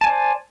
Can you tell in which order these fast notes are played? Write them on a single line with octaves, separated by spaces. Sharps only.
A5 G#5 D5 C5